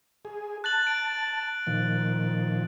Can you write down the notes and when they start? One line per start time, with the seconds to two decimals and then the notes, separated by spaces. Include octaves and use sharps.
0.25 G#4
0.64 A5 F#6 A6 F#7
0.83 D7 F#7
1.67 A#2 D#3 F3